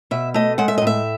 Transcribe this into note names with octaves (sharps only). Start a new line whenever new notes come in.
B2 E5
A3 D#5
G#3 F#5
E5
D#5
A2
E5